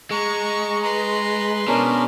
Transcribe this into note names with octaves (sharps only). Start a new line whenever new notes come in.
G#3 A#5 C#6
B4 A#5 C6
B2 C#4 D4 A#4